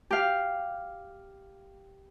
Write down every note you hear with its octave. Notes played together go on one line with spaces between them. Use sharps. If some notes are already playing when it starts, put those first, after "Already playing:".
G4 F5